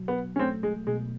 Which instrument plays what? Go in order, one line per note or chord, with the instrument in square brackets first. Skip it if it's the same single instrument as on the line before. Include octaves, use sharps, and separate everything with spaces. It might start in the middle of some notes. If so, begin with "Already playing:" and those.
Already playing: [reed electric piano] B2 F#3
[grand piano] B3
C#4
[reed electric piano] A3 [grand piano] C4
[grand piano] G#3
[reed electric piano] B2 [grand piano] G#3